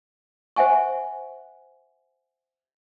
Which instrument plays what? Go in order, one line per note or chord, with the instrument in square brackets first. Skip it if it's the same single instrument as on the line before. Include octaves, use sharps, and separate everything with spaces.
[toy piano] C5 E5 F#5 G#5 C#6